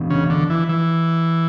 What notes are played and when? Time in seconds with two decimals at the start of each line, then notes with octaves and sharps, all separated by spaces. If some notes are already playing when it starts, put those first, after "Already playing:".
Already playing: E3 B3 D4
0.10 C#3
0.30 D3
0.50 E3
0.69 E3